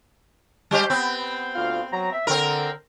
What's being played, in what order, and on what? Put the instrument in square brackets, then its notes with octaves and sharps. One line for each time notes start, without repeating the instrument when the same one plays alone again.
[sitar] G3 G4 C5
B3 C4
[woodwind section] D2 F4 F5
F#3 A#5
E5
[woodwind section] D3 [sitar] C4 A#4